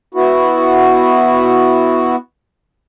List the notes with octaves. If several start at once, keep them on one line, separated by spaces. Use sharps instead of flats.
B3 E4 F#4